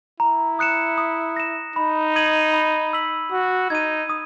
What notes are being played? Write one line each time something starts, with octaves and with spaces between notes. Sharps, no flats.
E4 A#5
D#6 F#6 C#7 E7
D#6
A#6 E7
D#4 B5
D#6 G#6 D#7 F#7
B5
E6 B6 F#7
F#4 E6
D#4 G#6 D#7
D#6